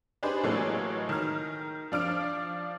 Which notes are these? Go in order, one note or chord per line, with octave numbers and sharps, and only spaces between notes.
D4 D#4 G4 G#4 B4 C5
A2 E3 F#3 G#3 A#3 A4
D#3 A#5 F6
F3 D4 F6 D7